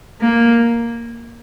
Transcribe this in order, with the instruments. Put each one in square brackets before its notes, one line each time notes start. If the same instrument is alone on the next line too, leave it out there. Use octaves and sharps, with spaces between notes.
[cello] A#3